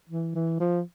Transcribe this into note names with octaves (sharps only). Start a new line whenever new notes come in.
E3
E3
F3